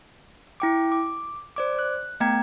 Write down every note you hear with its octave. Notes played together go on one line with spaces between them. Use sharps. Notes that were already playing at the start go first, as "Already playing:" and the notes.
E4 G5 D6
D6
C5 D5 D6
F#6
A3 B3 G5 A#5 G#6